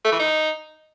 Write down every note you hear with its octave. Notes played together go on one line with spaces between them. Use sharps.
A3
E3
D#4